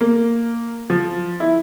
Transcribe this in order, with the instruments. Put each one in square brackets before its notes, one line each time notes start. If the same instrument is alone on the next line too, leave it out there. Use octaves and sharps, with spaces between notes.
[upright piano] A#3
F3
E4